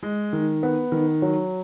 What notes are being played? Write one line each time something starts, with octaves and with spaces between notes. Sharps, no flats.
G#3
D#3
B3
D#3
F#3